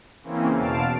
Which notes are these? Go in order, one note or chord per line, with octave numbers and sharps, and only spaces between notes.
C#3 E3 A#3 C4 C#4
E2 B2 F5 A5 D7